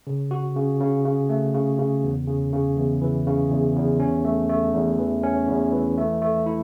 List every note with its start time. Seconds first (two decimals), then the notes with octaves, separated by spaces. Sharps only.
0.07 C#3
0.31 F#4
0.56 C#3
0.80 C#3
1.05 C#3
1.29 A3
1.54 C#3
1.78 C#3
2.03 E2
2.27 C#3
2.53 C#3
2.77 E2
3.01 E3
3.27 C#3
3.51 E2
3.76 E2
4.00 C#4
4.25 A3
4.49 A3
4.74 E2
4.99 E3
5.23 C#4
5.48 E2
5.72 E3
5.98 A3
6.22 A3
6.46 E4